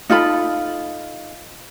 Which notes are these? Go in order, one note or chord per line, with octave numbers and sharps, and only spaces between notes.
D#4 F4 A4 B5